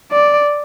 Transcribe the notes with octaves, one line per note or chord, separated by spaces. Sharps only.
D5